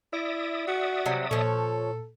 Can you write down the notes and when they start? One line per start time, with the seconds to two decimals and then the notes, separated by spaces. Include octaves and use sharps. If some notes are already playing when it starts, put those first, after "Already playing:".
0.13 E4 D5 E5 D#6
0.68 F#4
1.06 C3 F#3 G3
1.31 A#2 F3 A4 C#5